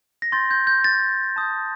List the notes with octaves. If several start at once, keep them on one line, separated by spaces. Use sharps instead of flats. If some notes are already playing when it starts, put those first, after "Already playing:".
A#6
C6 G6 A6
G6
G6
A6
A5 D#6 G6